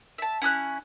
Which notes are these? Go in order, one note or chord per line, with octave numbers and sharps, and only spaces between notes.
E5 A5
C#4 E4 D#6 F#6